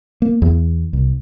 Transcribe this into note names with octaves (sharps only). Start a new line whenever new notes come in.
A#3
E2
C2